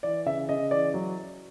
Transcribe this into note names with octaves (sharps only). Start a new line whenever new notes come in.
E3 D5
C#3 E5
C#3 D#5
E3 D5
F#3